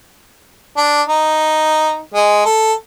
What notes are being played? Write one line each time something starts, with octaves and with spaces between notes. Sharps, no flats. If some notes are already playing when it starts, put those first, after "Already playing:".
D4
D#4
G#3
A4